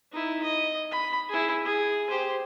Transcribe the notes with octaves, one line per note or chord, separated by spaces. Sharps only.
D#4 E4
D#5
B5
E4 G#4
G#4
G4 C5